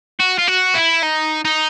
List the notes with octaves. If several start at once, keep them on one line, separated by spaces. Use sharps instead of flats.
F#4
F4
F#4
E4
D#4
D#4